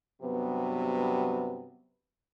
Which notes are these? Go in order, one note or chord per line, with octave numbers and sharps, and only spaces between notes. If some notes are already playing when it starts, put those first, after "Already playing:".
G2 C3 F#3 B3